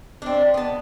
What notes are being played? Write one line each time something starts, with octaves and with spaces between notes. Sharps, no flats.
C4 D4
B3 A5